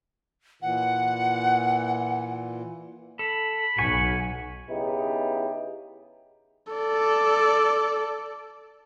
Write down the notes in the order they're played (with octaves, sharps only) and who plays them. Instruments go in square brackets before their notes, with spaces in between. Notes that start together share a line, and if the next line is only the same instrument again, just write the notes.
[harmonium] A#2 E3 [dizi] F#5
[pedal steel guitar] A4 [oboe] B5
[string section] B1 [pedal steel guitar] F#5 G#5 C#6
[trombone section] C#3 B3 D#4 E4 G4
[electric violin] A4 D5